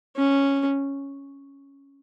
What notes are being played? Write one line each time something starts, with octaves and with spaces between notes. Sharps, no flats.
C#4